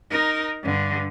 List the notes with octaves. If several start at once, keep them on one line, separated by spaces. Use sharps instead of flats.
D#4 A#4
G2 D3